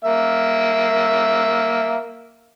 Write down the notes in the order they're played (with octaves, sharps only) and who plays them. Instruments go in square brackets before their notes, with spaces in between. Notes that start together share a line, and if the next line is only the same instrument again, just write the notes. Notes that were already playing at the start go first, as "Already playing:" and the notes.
[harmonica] A#3 E5